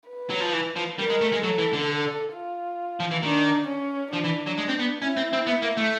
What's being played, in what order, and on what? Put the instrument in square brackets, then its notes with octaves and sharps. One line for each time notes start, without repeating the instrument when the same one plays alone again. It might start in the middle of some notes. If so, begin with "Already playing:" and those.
[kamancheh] B4
[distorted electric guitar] F#3
F3
E3
F3
[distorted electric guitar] G3 [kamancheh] A#4
[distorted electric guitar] G#3
A3
G#3
[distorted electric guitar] F#3 [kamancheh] A4
[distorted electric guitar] E3
D3
[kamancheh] F4
[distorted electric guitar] F3
E3
[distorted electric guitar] D#3 [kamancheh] D4
[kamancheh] C#4
[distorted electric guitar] F3 [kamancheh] D4
[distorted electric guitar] E3
F#3
G#3
C4
B3
[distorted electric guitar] C#4 [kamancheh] E4
[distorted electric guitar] C4
C4
B3
A#3
A3